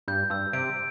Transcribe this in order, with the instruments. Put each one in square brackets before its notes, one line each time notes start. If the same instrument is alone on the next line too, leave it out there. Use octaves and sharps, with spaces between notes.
[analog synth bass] G2 [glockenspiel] G6
[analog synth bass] G2 [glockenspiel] E6
[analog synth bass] C3 [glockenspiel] D7